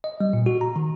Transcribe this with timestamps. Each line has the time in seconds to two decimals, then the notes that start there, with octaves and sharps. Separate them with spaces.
0.04 D#5
0.20 G3
0.33 A#2
0.46 F#4
0.61 A#5
0.76 D#3